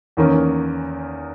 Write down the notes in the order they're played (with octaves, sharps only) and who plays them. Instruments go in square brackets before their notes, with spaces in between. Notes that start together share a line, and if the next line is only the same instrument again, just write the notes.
[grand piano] E2 D#3 A#3 C#4